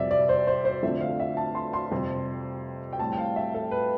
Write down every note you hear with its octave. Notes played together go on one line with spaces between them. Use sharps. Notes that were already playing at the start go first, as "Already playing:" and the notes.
Already playing: F2 C3 G3 D5 E5
D5
C5
C5
C5
F2 D3 F3 A3 C4 E5
F5
E5
A5
C6
C6
F2 C3 G3 C4
G5
A2 G3 C4 A5
G5
F5
E5
A4
B4